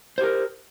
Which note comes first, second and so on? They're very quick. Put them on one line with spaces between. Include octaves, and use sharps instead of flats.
C5 G4 A#4